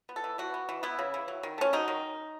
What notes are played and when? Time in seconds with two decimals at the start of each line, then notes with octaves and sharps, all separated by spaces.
0.09 B3
0.16 A4
0.24 E3
0.38 E3 F#4
0.54 B3
0.69 E3
0.83 B3 E4
0.99 C#3
1.14 E3
1.28 F#3
1.43 D#3
1.58 A3 C#4
1.73 F#3 D#4
1.88 D#3